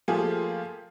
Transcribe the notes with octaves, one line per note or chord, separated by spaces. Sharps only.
F3 A3 A#3 F4 G4 G#4